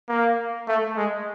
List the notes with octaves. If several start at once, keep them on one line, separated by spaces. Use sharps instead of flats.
A#3
A3
G#3